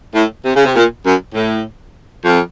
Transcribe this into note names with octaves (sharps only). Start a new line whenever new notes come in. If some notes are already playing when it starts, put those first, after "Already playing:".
A2
C3
C#3
C3
A#2
F#2
A2
F2